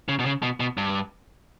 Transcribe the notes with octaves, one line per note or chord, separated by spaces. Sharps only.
C#3
B2
C#3
B2
B2
G2